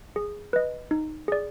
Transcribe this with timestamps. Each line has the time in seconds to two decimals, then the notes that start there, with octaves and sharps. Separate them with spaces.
0.16 G#4
0.53 B4 D#5
0.91 D#4
1.28 G#4 D5